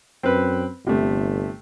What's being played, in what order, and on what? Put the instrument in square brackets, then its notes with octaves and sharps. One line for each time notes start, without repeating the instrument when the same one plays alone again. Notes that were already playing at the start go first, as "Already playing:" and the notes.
[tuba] F#2 [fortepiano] C4 B4
[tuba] G1 [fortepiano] C3 A3